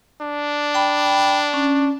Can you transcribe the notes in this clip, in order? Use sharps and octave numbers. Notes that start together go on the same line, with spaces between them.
D4
G5 B5
C#4